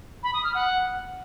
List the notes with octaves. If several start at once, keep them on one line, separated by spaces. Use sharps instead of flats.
B5
D#6
F6
F#5